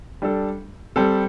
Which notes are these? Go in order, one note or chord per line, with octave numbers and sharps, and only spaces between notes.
G3 D4 A4
G3 C4 A4